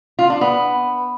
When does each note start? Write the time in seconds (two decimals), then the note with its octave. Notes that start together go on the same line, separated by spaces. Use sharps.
0.19 F4
0.30 D4
0.41 B3